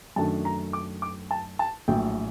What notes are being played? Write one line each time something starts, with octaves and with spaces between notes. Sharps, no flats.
F#2 D#3 A3 D4 A5
A#5
D6
D6
A5
A5
A#1 A2 F#3 G5